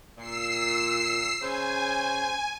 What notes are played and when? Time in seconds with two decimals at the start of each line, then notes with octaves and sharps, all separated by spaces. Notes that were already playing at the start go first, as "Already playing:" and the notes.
0.18 A#2 E6 C7
1.42 C#3 C5 G#5